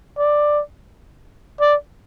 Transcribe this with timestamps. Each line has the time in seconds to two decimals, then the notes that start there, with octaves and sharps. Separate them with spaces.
0.18 D5
1.61 D5